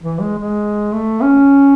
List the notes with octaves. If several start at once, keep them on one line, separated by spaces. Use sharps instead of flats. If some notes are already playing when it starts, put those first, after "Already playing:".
E3
G#3
G#3
A3
C#4